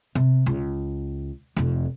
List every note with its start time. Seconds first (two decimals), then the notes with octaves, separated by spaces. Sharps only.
0.15 C3
0.46 C#2
1.57 F1 F2